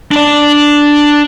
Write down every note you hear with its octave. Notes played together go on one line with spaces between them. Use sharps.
D4 D5